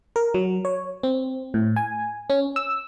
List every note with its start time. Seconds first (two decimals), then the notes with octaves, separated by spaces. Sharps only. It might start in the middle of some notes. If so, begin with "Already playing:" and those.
0.16 A#4
0.34 F#3
0.65 C#5
1.03 C4
1.54 A2
1.76 G#5
2.30 C#4
2.56 E6